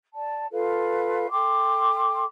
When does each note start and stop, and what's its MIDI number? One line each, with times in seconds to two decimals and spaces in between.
0.14 0.46 74
0.14 0.46 81
0.52 1.26 65
0.52 1.26 69
0.52 1.26 71
0.52 1.26 77
1.32 2.24 69
1.32 2.24 79
1.32 2.24 84
1.32 2.24 86